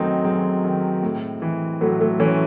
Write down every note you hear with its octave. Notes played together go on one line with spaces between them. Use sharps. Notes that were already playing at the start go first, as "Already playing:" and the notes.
Already playing: F#2 D#3 F#3 A3 C4 D#4
F#2 G#3 C4
D#3
A2
E3
A2 F#3 A3
F#3 A3
E3 A3 C#4